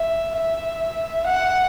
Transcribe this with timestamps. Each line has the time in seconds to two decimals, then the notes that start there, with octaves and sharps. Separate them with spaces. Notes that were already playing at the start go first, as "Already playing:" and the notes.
Already playing: E5
0.36 E5
1.26 F#5